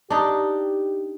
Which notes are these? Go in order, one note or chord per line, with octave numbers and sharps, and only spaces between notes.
D4 D#4 G4